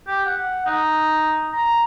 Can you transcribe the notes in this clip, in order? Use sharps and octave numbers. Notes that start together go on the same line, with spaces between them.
G4
F#5
D#4
A#5